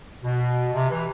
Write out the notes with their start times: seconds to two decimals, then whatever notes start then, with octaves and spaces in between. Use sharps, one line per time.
0.24 B2
0.74 C3
0.90 E3